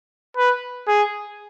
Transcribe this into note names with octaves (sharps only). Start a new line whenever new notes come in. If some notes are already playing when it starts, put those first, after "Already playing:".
B4
G#4